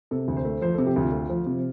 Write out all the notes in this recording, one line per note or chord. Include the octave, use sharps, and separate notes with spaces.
C3 A4
D2
C5
A3
F3 C5
C3 A4
G4
D2 F4
A3
F3
C3